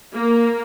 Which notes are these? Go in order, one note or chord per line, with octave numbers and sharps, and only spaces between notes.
A#3